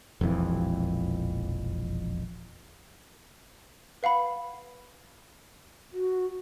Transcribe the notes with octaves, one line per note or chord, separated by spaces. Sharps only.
E1 A#1 F2 E3
B4 F5 F#5 B5
F#4